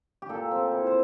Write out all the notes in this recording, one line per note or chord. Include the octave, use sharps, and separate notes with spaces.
G4
A#2 A4
C4
E4
C5